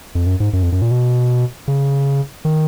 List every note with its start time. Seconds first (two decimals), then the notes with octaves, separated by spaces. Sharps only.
0.15 F2
0.27 F#2
0.40 G#2
0.53 F#2
0.63 F2
0.72 F#2
0.82 A#2
0.91 B2
1.68 C#3
2.45 D#3